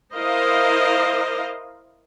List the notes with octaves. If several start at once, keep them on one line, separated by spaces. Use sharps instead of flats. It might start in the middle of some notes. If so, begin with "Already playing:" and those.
E4 A#4 C5 D#5 F5